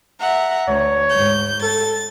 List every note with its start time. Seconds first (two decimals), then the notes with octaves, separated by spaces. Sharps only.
0.20 E5 F#5 A#5
0.68 D2 C#5
1.10 G#2 G6
1.62 A4 A6